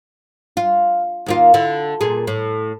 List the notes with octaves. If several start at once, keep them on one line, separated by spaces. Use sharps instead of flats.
F4
D#2 A#3 F4
D3 E4
A#2 G#4
A2